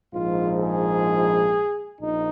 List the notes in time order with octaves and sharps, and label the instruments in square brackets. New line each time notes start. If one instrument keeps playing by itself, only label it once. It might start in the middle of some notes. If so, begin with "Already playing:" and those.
[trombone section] A#1 G#2 F3 F4
G#4
A#1 D#4